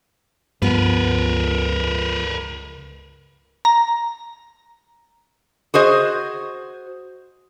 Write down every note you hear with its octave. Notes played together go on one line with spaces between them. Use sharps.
C#2 G2 F3 B3 A#4 B4
A#5
F#4 G#4 C5 D#5